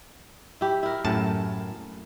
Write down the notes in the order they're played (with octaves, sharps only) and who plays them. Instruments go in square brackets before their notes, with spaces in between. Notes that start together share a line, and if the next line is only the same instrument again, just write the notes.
[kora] E4 G4
E4 A#4
[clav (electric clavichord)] F#2 A2 A5